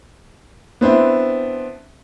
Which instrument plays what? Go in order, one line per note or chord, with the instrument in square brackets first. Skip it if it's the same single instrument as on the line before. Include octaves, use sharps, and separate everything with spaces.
[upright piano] B3 C4 D4 E4